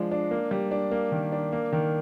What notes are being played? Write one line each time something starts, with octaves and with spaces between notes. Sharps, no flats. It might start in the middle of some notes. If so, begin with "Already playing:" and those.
Already playing: F3 G#3 D4
D4
A#3
G3
D4
A#3
D#3
D4
A#3
D#3